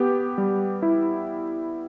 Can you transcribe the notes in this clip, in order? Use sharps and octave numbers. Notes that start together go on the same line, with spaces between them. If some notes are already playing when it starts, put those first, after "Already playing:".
Already playing: B3 G4
G3
E4